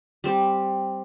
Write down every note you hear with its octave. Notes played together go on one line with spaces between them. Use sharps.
G3 C4 G4